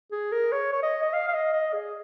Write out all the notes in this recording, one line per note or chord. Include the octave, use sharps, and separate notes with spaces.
G#4
A#4
C#5
C#5
D#5
D#5
F5
F5
D#5
D#5
G#4